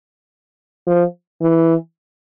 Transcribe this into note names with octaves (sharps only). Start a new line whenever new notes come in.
F3
E3